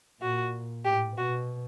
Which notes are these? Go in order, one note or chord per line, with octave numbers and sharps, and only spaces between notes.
A#2 F#4
A2 G4
B2 F#4